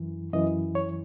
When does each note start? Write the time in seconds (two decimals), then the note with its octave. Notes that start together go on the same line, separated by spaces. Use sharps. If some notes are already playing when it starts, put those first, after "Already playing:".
Already playing: F#2 E3
0.33 F#2 E3 D#5
0.75 C#5